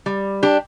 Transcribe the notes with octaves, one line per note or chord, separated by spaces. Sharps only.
G3
D4 G4